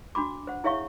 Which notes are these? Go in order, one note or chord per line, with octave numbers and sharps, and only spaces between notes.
D4 F#4 B5 D6
C5 F#5
E4 G#4 C#5 E5 F5 C#6